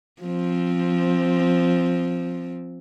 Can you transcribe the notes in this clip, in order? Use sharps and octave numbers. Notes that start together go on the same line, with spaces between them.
F3 C4